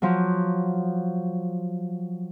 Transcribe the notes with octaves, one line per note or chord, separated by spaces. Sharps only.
F3 F#3